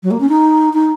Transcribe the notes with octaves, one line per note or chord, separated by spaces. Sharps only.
F#3
A#3
C#4
D#4
D#4